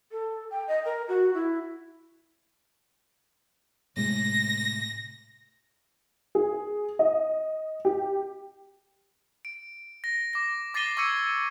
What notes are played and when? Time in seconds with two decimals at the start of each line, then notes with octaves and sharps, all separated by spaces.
0.11 A4
0.50 G5
0.67 D#5
0.85 A#4
1.08 F#4
1.34 E4
3.97 A2 C3 G#3 A#6
6.35 G#4
6.99 D#5
7.85 G4
9.45 D7
10.04 A#6
10.33 D6 A#6
10.74 D6 A6 A#6 C7 D#7 G7
10.97 C#6 D6 E6 G#6 C#7 D#7